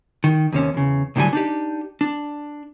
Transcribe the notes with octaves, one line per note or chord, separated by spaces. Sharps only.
D#3
D#2 C3 C#4
E2 C#3
C2 A2 D3 F#3 G3 G#5
D4 D#4 G4
D4